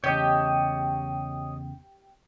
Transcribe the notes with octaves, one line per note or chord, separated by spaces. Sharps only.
E2 C#3 G4 C#5 D#5 A5